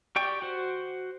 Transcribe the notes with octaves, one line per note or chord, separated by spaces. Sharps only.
G4 D5 G5 C#6
F#4 C5